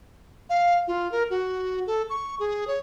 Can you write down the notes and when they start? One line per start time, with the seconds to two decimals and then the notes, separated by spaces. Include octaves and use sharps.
0.50 F5
0.88 F4
1.12 A#4
1.30 F#4
1.87 A4
2.10 C#6
2.40 G#4
2.67 C#5